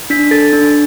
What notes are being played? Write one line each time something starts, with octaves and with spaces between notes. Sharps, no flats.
D4 B6
A4 A6
D4